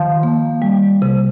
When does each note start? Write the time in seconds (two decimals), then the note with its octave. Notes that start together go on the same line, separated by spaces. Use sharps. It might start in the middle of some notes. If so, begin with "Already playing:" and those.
Already playing: D#3 F3
0.23 A#3
0.62 G3
1.02 C3